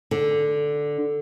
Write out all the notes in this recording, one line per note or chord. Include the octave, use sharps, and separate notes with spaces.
D3